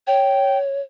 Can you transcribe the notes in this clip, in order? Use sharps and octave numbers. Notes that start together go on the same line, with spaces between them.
C#5 G5